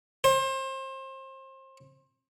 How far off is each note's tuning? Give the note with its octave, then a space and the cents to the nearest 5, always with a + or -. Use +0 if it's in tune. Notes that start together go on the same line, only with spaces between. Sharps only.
C5 +30